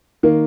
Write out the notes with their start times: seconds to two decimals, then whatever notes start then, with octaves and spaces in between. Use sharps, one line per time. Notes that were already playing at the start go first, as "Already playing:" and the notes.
0.23 D#3 A#3